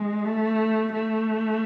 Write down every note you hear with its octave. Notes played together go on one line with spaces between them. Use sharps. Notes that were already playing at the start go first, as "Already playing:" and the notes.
Already playing: G#3
A3
A3